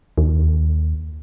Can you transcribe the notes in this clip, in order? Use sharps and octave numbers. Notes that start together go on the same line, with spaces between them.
D#2